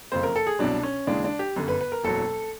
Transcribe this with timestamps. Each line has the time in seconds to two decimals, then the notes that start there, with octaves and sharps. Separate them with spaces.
0.12 F#1 F2 C#3 C5
0.23 A#4
0.36 A4
0.47 G#4
0.59 C2 B2 F#3 D4
0.83 C#4
1.07 D#2 C#3 E3 G#3 D4
1.24 D4
1.39 G4
1.56 G1 F#2 D3
1.68 B4
1.81 B4
1.92 A#4
2.04 F#1 E2 B2 F#3 A4